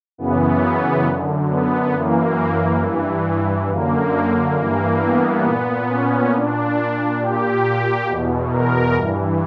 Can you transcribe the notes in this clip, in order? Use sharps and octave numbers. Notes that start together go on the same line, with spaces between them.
F#2 C#3 E3 B3
B3
F#2 D3
B3
F#2 E3 A#3
G2 E3
F#2 D3 A#3
G2 E3 A#3
B3
A#2 B3
C#4
A#2 D4
A#2 G4
G4
E2 B2
A#4
G2 E3